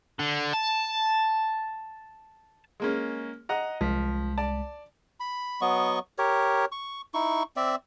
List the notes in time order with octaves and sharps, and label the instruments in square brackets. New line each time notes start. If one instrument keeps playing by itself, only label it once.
[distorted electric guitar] D3
A5
[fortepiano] G#3 A#3 C#4
D#5 F#5 A#5
[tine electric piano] C2 G#3 B6 [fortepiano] F3
[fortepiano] D5 A5
[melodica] B5
F#3 B3 D#5 C#6
G4 A#4 C#5
C#6
D#4 E4 C#6
C4 D5 E5